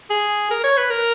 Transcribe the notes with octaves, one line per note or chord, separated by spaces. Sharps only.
G#4
A#4
C#5
B4
A#4